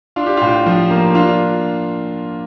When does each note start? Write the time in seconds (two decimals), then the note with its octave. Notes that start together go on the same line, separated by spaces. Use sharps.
0.16 D4 F4
0.26 G4
0.37 A2 F4
0.66 F3
0.90 A#3
1.15 D4 F4